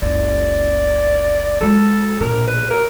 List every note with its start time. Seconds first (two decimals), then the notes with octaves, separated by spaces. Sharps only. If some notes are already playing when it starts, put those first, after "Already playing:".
0.02 F#1 C#2 D5
1.61 F#3 G#3 A4
2.20 A#1 B2 A#4
2.48 B4
2.70 A#4